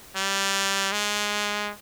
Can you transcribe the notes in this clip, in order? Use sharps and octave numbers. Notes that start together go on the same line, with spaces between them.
G3
G#3